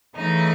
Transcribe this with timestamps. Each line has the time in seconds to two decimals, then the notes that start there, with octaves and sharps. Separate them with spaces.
0.16 C#3 E3 A3 D#4